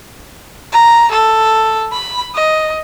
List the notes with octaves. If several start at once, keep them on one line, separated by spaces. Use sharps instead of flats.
A#5
A4
B5
D#5